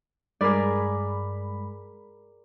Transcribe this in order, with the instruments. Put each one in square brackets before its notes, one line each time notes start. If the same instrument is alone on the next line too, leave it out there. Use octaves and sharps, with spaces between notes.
[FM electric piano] G2 G#3 B5 [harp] G#4 A#4 D5